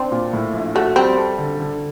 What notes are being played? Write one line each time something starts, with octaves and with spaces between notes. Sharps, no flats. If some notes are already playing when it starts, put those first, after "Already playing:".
Already playing: C4 D4
A#2
A2
A#1
A3 F#4
G3 C4
A4
D3
D3